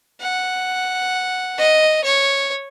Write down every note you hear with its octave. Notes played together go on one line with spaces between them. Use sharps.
F#5
D#5
C#5